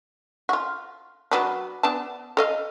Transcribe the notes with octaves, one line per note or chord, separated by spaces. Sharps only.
F4 F#4
F#3 B3 D4
B3 D4 A5
A4 D#5 F5